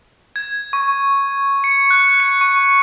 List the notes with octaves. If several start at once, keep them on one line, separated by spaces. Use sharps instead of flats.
G#6
C#6
C#7
F#6
C#7
C#6